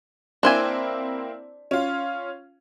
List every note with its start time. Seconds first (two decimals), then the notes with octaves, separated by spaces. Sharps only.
0.43 A#3 C4 D4 E4 C5 G#5
1.71 C#4 F4